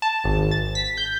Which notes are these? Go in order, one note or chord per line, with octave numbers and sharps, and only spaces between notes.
A5
G#1
A6
B6
G6